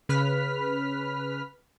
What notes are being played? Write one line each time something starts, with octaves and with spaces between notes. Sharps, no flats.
C#3 B4 F6 B6